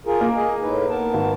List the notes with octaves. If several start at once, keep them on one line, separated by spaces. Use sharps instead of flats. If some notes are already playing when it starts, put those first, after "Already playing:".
F4 G#4 A#4
A#3
G#4 D#5
A2 D#4 B4
B3 A#4 A5
G#1